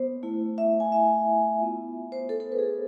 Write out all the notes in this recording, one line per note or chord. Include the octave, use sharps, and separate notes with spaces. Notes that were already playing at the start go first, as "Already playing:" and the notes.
Already playing: B3 C5
A3 E4
E5
G#5
E5
B3 F4
C5
A4
A4
B4
G#4
A4